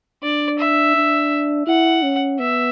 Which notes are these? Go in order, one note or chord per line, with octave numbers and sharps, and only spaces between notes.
D4 D5
E5
D4
E4 F#5
C#4
B3 E5